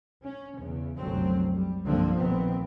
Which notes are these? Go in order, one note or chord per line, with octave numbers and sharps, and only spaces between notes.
C#4
E2 C#3
F1 C2 F#2 D3 F#3 C4
G3
C2 G2 D3 F3 A#3 C4
A#1 F2 D#3 B3 C4